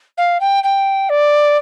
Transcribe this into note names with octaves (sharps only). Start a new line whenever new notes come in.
F5
G5
G5
D5